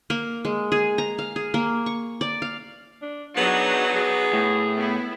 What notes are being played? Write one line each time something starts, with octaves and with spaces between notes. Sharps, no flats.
A#3
G#3
G#4
A#5
F5
G#4
A#3
C#6
D5
F5
D4
F#3 B3 D4 D#4 G#4
G#4
A2
B3 E4